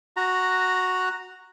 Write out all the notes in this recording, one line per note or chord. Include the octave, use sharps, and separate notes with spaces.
F#4 A#5